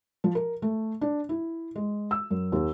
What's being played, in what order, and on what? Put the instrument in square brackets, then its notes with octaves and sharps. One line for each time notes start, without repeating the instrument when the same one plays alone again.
[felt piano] F3
A#4
A3
D4
E4
G#3
E6
F#2
D#2